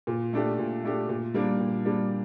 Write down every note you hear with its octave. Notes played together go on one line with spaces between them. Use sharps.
A#2
A3 D4 G4
A#2
A3 D4 G4
A#2
G3 A#3 D4
A#2
G3 A#3 D4